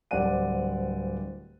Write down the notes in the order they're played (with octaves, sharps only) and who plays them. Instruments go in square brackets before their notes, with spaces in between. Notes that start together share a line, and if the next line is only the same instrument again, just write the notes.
[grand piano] D1 G3 C4 D5 F#5 D#7